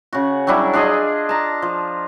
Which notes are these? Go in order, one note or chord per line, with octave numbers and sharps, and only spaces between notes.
C#3 F#4
F#3 G3 D4 E4
D4 F4 G#4 D#5
A5 A#5
F3